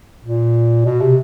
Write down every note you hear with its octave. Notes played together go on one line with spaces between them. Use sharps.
A#2
B2
C3